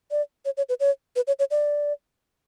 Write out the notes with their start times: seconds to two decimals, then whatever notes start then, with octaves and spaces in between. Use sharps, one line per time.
0.11 D5
0.45 C#5
0.57 C#5
0.69 B4
0.80 C#5
1.16 B4
1.27 C#5
1.39 C#5
1.51 D5